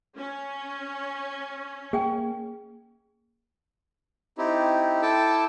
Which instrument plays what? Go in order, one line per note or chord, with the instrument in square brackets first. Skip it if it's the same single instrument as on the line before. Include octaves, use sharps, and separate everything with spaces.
[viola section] C#4
[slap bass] A#3 [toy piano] G#4 G5 G#5
[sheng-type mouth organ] C4 D#4 E4 G4
E4 A4 G5 A5 D6 E6